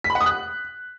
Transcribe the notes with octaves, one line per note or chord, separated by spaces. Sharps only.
B6
B5
F#5
D#6
F#6